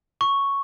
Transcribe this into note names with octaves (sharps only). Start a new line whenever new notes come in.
C#6